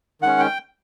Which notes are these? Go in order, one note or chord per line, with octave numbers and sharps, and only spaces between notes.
D#3 G#3 C#4 F#5
G5